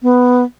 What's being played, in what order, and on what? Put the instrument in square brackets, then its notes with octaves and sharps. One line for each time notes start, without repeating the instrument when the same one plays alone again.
[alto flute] B3